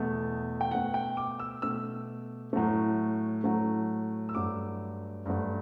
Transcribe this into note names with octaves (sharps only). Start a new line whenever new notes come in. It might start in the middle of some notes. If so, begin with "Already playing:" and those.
Already playing: E2 B2 A3
G5
B2 A3 F#5
G5
D6
E6
B2 A3 E6
A2 F#3 A3
A2 F#3 A3
E6
G2 F#3 A3 D6
G2 F#3 A3